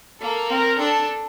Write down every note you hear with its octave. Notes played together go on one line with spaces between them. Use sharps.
A#3 A4
C4 A#4
D4 A4